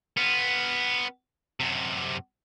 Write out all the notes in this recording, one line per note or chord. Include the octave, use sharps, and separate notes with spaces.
B3 F4
F#2 C3